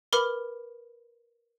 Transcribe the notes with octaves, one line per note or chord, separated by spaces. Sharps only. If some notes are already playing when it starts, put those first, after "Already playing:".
A#4 B4 B5 D6 F6